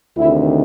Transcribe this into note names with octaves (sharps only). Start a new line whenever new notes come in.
D2 C3 D#3 E4